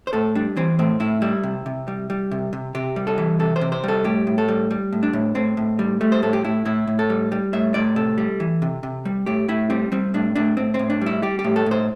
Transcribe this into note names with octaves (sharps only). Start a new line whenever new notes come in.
C5
A2 A4
G3 D4
E3 C4
A2 C4
A2 E4
G3 E4
C3
C3
G3
G3
C3
C3
C3 G4
G3
A4
E3
C3 A4
C5
C3
C5
G3 A4
A2 G4
A2
A4
G3
G3
A2
D4
A2
A2 C4
A2
G3
G3 A3
C5
A2 A4
G4
A2 E4
A2 E4
A2
A4
G3
G3
A2 E5
A2 D5
C3 A4
G3
E3
C3
C3
G3
A2 G4
A2 E4
G3 C4
G3 C4
A2 D4
A2 D4
A2 C4
C4
A2
D4
G3 E4
G3 G4
G4
A2
A4
A2 C5